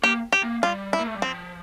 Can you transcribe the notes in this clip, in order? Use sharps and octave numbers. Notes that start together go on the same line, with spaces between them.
A#3 G4
G4
A#3
G3 F4
E4
A#3
A3
G3
F3 C4